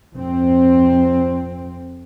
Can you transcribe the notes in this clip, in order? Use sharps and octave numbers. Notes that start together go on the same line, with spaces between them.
F2 C4